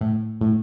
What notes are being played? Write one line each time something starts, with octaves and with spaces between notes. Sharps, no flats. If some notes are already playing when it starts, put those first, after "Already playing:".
A2
A2